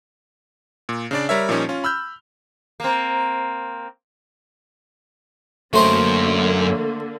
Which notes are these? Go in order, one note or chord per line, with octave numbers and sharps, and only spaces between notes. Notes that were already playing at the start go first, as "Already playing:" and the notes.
A#2
C#3 D4 D5
G3 A#4 C#5 E5
A#2 F3 G3 A#3 C#4 D#4
C#4 F4
B5 E6 F6 G6
A#3 C4
F#2 D3 A3 A#3 C5 D#5